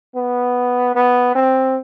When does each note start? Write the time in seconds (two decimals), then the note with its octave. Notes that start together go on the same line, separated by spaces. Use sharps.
0.16 B3
0.95 B3
1.35 C4